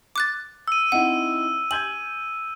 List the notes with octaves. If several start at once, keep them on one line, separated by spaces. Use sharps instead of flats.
D6 F#6 A6
E6 D#7
C4 D#4 E4 F#5
G#5 G6 G#6 F#7